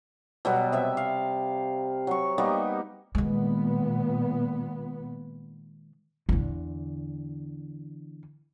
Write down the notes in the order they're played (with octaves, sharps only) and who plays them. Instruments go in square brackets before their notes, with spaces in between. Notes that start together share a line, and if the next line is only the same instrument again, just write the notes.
[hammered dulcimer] B2 F#3 G3 B3
C3 E5
F5
F#3 C#6
G3 A#3 B3 D#4
[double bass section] A#2 B3 [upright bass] D#3 G#3
[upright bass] E2 D3